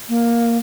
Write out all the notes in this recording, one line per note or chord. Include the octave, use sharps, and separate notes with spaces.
A#3